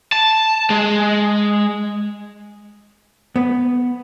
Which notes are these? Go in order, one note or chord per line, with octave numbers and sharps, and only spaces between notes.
A5
G#3
B3